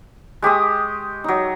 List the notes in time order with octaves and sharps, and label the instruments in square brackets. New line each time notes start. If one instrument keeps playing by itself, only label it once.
[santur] G#3 G4 C#6 D#6
F#3 D#4